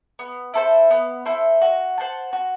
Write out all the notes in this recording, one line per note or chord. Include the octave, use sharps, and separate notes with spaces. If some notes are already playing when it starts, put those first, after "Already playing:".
B3
E4 A4 C5
B3
E4 A4 C5
F#4
C5 F#5 A5
F#4